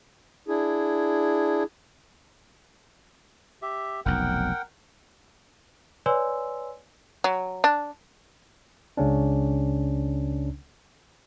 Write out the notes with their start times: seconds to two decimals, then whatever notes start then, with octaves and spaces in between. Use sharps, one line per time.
0.48 D4 E4 G#4
3.62 G4 E5
4.06 F1 B1 A#4 F#5 G5
6.06 B4 C#5 D5 G#5 C6 E6
7.24 F#3
7.64 D4
8.97 C#2 C#3 C#4 D4